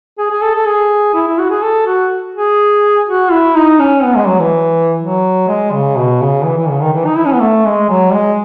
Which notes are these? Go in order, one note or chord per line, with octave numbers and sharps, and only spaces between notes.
G#4
G#4
A4
A4
G#4
E4
E4
F#4
G#4
A4
F#4
G#4
F#4
E4
D#4
C#4
B3
G#3
F#3
E3
F#3
G#3
C#3
B2
C#3
E3
E3
C#3
D#3
E3
D#4
E4
C#4
B3
A3
G#3
F#3
G#3